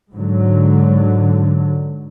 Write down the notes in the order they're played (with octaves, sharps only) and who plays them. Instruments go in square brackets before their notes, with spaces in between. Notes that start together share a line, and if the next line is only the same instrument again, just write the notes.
[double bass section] G#2 D3 F#3